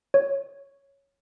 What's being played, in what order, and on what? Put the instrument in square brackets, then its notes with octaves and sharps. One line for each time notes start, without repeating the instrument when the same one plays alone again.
[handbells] C#5